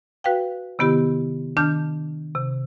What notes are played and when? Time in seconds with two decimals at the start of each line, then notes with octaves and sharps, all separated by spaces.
0.24 F#4 B4 F5 G5
0.79 C3 D#3 B3 E4 G4
1.57 D#3 D4 A5 F6 G6
2.35 C3